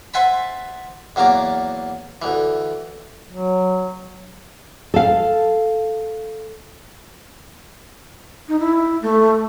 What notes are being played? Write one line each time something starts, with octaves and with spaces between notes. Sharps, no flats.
C5 E5 F#5 G#5 A5 B5
E2 F#3 A#3 A5 A#5 D6
D2 E3
F#3
A4 F5
D#4
E4
A3